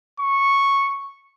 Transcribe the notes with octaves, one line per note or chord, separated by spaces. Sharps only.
C#6